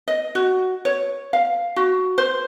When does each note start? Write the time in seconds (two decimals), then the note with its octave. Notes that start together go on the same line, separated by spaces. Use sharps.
0.08 D#5
0.35 F#4
0.85 C#5
1.33 F5
1.76 F#4
2.18 C5